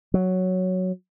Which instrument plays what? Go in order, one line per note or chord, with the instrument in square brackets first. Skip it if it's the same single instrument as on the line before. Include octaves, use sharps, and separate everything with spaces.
[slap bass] F#3